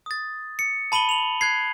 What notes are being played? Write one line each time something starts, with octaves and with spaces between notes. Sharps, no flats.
D#6 A6
C#7
A5 B5 D#7 F#7 G7
F7 F#7
F#6 G#6 C7